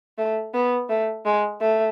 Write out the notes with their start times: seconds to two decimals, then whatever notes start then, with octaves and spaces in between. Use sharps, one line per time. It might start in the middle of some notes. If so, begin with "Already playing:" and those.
0.18 A3
0.54 B3
0.89 A3
1.26 G#3
1.61 A3